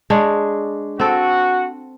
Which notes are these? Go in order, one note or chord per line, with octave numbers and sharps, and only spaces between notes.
G#3 D4 C#5
C4 F#4 A4